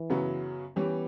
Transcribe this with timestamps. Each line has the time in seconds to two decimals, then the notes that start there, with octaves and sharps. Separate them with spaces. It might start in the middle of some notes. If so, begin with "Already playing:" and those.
Already playing: E3
0.10 F#2 C#3 F#3 B3
0.76 E3 G3 B3 C#4 G4